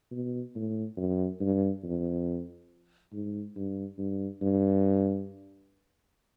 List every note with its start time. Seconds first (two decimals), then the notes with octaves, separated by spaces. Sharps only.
0.12 B2
0.55 A2
0.97 F#2
1.40 G2
1.84 F2
3.13 G#2
3.56 G2
3.98 G2
4.41 G2